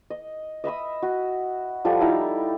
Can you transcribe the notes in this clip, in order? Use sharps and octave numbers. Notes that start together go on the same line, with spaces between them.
D#5
D#5 E5 B5 D#6
F#4
F3 G3 A4 D#6
D#4 E4 G4 F5